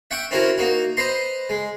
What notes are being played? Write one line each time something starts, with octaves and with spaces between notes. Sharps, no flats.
E5 F#5 G5 C#6
C4 C#4 E4 F#4 A#4
A#3 D#4 F#4
B4 C5 D#5 A#5 C6
G#3